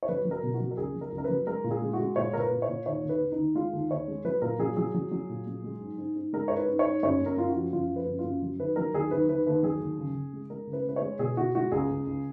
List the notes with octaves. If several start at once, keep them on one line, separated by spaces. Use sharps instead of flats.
C#5
F#3 B4
F#3
A#4
B2
F#4
F#3
A#4
C#2 G#4
F#3
A#4
C#2
A#4
F#3 B4
G#3 A#4
A#2
G#4
G#3
F#4
G#3
A#2 C#5
A#2 A#4
B4
A#2
C#5
A#2
D#2 C#5
D#2
B4
D#3
D#4
D#2
G#3 F4
D#2
D#2 C#5
G#3
F#3 B4
A#2 A#4
F#3 G#4
F#3 G#4
F#3
F#3
A#2
F#3
G#3
G#2
G#2
G#2
G#3 A#4
G#2 C#5
B4
G#2
C#5
G#2
F#2 C#5
F#2
A#4
F#2 F4
F#4
F3
F#2 F4
F3
B4
F#2
F4
F#2
F#3
D#3 B4
F#3 A#4
D#2 G#4
D#3 B4
D#3 B4
D#2 B4
F#3 G#4
D#2
C#3
C#3
G#3
G#3 A#4
C#3
B4
G#3 B4
C#5
G#3
B2 G#4
B2 F#4
G#3 F#4
C#2 G#4
C#2
C#2